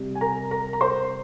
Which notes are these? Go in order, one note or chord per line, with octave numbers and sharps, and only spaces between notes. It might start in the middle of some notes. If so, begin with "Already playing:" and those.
Already playing: C3 G3
G#5
A#4 A#5
A#4 A#5
A#5
C5 C6